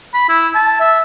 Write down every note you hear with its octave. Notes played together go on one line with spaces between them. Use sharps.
B5
E4
A5
E5